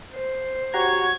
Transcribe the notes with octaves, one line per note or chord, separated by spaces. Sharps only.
C5
F#4 G4 C#5 F#5 A#5 G#6